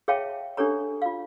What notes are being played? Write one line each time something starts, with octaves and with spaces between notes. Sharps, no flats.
G#4 C#5 E5 F5 G5 A5
D4 G4 A4 C#5 A#5
F4 F5